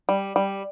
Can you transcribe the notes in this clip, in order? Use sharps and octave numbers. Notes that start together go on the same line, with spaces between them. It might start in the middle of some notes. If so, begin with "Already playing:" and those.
G3
G3